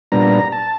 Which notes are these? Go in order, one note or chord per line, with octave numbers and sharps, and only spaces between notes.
A#2 G3 B3 D4 A#5
A5